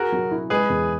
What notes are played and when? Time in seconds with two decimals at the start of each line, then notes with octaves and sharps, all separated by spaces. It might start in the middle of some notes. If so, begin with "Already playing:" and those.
Already playing: F#4 G#4 A#4
0.12 F#3
0.31 E4
0.50 G#3 G#4 B4
0.69 E2